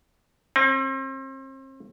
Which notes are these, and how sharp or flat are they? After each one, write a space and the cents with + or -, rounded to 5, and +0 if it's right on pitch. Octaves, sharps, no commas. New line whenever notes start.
C4 +40